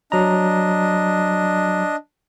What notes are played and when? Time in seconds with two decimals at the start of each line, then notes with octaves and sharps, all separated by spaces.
0.12 F#3 D4 D#5 A#5